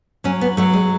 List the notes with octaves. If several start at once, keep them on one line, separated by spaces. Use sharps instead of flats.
F#3 C#4
B3
F#3 A3
G#3